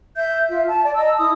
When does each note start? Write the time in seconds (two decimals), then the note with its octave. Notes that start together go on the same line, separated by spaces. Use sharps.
0.17 E5 G6
0.48 F4 E5
0.68 A5
0.84 D5
0.96 D#5 A5 A#5 E6
1.18 E4 D#6